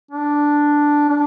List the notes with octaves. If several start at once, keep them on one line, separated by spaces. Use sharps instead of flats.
D4
D4